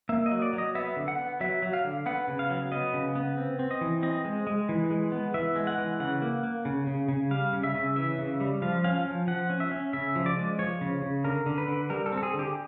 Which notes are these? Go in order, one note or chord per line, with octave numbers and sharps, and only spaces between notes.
A#3 E5
D#5
F#3
D5
F#3
D#5
B3 E5
D3
F#5
B3
F#3 E5
F#3
F5
D3
B3 F#5
C#3
F5
F#3
B3 D#5
C#3
B3
C4
C4
D#5
E3
C4 D#5
G#3
G#3
E3
G#3
B3
E3 E5
G#3
F#5
E3
C#3 F#5
A#3
A#3
C#3
C#3
C#3
G3 F5
C#3
E5
C#3
E3 E5
C#3
G3
F3 F5
C#4 F5
F3
F3 F#5
C#4
E5
C#4
C#3 E5
F3
D5
G#3
F3 C#5
C#3
C#3
D3 A#4
D3
B4
D3
G3 A#4
A4
C4
A4
G#4
D3 G4